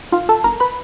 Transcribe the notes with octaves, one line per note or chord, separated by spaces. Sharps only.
D#3 F4 F5
A4 A5
G1 A#4 A#5
B4 B5